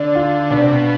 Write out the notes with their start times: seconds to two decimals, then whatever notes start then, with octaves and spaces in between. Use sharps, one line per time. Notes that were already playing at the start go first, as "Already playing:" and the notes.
Already playing: D3 D4
0.15 F4
0.50 B2 D4
0.61 C3
0.72 B2